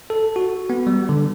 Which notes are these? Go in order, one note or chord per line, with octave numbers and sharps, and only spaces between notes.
A4
F#4
B3
G3
D3